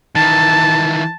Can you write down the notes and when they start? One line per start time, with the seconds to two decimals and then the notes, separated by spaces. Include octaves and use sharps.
0.15 D#3 E3 A5